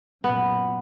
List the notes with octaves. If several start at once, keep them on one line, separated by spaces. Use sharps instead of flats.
F#2 A#2 B3